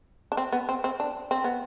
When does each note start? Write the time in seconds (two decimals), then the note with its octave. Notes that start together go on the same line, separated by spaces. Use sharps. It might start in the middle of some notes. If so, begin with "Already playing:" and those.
0.32 D4
0.37 C4
0.52 B3
0.69 C4
0.84 C4
1.00 D4
1.31 C4
1.44 B3